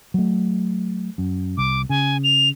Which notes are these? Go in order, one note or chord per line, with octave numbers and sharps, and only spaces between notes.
F#3 A3
F#2
C2 D6
C#3 G#5
F7